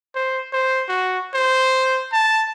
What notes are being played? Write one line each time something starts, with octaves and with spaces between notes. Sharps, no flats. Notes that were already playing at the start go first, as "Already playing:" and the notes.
C5
C5
F#4
C5
A5